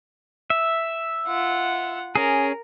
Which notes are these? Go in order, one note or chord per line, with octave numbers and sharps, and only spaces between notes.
E5
F4 F#5
C#4 G#4 A#4